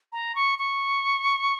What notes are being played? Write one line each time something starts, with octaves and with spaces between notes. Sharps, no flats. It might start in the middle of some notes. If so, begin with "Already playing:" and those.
A#5
C#6
C#6